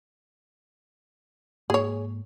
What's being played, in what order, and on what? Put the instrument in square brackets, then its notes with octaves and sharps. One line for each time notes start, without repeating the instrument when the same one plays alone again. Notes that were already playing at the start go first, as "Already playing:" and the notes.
[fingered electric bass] G#2 A#3 [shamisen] G#4 C#5